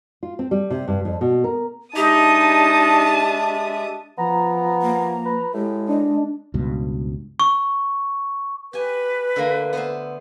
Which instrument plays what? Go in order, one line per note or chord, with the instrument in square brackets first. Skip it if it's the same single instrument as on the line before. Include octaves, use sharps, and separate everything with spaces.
[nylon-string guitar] F4
C4
G3
C3
G2
F2
B2
A#4
[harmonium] G#3 E5 [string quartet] D4 A5 D#6 [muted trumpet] D#4 [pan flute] G4
[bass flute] F3 [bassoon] B3 [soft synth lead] A#5
[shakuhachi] A#3
[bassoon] B4
[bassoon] A2 [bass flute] G#3 [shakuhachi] G4
[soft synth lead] D4 [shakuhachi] D#5
[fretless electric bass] C#2 G2 B2
[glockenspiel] C#6
[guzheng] G4 G#5 [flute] B4
[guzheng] D3 A3 A#3
B3 C5 E5